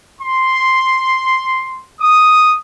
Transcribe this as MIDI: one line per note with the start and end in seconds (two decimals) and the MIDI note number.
0.22 1.85 84
2.01 2.56 87